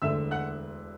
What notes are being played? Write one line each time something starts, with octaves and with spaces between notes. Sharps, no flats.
E1 D2 D3 A3 E5 E6
F#5 F#6